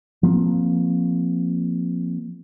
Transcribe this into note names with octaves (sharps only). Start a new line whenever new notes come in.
F3 A#3 C4